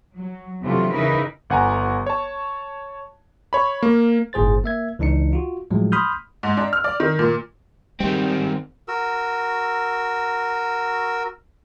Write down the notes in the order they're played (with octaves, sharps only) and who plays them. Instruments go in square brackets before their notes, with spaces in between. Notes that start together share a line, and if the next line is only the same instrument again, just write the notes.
[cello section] F#3
C3 E3 F#3 A3 D4 F4
C#3 E3 D#4 E4 A#4 B4
[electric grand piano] G1 F#5 G#5 A#5
C#5 A5
C#5 B5
A#3
[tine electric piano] G1 A2 G#4 C5 A6
A#3 E5 G#6
C#2 E3 D4 D#4 C#7
F4 F#4
A2 F3 F#3 G#3
B5 C6 D#6 F6 G6
[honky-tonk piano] G#2
D4
F6
D5
D#3
A#2
[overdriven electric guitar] D#3 C4 [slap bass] G3
[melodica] F#4 A#4 E6